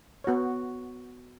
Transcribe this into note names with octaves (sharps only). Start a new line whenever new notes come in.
B3 F#4 C#5